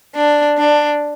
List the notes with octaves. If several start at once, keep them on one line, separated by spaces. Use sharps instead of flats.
D4
D4